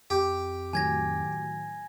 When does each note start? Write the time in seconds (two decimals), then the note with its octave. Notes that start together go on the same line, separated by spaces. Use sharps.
0.10 F2 G4
0.73 A2 D#3 F#3 G#5 G#6 A#6